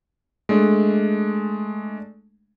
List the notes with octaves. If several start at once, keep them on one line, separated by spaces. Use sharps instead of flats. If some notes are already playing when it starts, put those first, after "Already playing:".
G#3 A3 D4